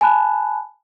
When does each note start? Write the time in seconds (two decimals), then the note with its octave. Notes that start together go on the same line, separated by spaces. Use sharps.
0.01 G#5 A5 B5 F#6